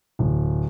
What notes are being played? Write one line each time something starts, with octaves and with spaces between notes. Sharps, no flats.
D1